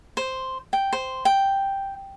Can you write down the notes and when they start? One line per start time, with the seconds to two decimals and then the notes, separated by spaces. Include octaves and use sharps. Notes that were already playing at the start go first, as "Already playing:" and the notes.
0.17 C5
0.73 G5
0.93 C5
1.25 G5